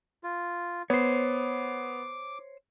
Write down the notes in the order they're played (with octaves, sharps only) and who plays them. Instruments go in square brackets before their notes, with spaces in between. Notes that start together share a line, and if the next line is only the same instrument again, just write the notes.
[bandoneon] F4
[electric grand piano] B3 [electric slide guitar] C5 C#5 [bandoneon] D6